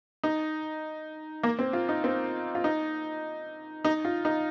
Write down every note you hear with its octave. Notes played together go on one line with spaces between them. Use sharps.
D#4
A#3
C4
F4
D#4
C4
F4
D#4
D#4
F4
D#4